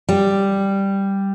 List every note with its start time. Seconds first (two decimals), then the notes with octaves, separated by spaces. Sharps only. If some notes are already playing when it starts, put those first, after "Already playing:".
0.09 G3